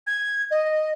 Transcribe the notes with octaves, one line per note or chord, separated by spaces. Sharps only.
G#6
D#5